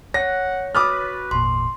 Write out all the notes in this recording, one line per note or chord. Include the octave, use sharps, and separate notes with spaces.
C#5 F#5 A#6
F#4 B4 B5 D6 D#6 F6 F#6 A6
G#1 E2 A#2 C6